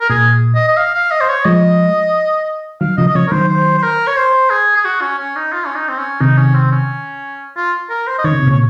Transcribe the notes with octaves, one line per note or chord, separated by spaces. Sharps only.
A#4
A#2 G#4
D#5
D#5
F5
F5
D#5
C5
C#5
F3 G#3 D#5
D#3 F#3 F5
C#3 F3 D#5
D#5
C#3 F3 C#5
A#4
D#3 F#3 C5
C5
C5
A#4
C#5
C5
G#4
G#4
F#4
C#4
C#4
D#4
F4
C#4
D#4
C4
C#4
C3 D#3 D#4
C#4
C4
C#4
F4
A#4
C5
D#5
D#3 C#5
C#3
C3
A#2 C#3 C#5